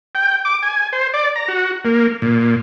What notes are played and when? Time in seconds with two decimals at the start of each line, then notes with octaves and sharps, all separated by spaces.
0.15 G5
0.45 D6
0.63 G#5
0.93 C5
1.14 D5
1.36 A#5
1.48 F#4
1.85 A#3
2.22 A#2